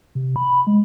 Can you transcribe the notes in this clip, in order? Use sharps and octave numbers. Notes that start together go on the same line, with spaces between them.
C3
B5
G#3